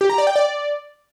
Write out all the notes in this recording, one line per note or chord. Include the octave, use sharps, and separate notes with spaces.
G4
A#5
D5
G5
D5